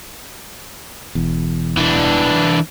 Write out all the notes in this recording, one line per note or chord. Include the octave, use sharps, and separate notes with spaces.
E1 E2
E3 D4